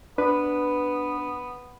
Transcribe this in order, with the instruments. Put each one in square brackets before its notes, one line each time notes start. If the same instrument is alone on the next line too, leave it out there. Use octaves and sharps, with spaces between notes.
[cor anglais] B3 [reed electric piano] D4 B4